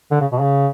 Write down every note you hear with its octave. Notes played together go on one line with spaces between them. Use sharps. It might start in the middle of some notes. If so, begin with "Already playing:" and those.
D3
C#3
B2
C#3